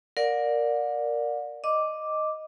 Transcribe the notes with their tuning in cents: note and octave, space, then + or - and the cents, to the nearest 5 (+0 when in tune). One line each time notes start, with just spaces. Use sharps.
A#4 +0 D5 +0 F#5 -45
D#5 +0 D6 +0